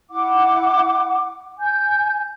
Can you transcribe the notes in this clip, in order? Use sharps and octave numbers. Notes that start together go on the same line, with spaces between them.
E4 F#5 D6
G#5 G6